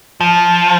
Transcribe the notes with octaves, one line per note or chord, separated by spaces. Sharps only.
F3